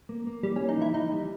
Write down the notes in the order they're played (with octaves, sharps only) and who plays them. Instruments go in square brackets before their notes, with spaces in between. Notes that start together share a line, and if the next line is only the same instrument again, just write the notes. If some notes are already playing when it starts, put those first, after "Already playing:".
[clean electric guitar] A#3
A#3
[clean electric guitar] E3 [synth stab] G3
[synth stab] C#4
[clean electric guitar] A#3
[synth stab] D#4
[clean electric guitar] E3 [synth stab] E4
[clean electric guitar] E3 [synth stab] D#4
[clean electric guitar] G3